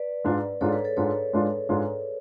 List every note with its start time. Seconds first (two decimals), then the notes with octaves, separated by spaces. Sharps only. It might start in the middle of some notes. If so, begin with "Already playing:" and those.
Already playing: B4 D5
0.24 G#2 G#3 D4 F4
0.61 G#2 G#3 D4 F4 A4 C#5
0.72 G#4 B4
0.84 A4 C#5
0.97 G#2 G#3 D4 F4 A4 C#5
1.33 G#2 G#3 D4 F4
1.69 G#2 G#3 D4 F4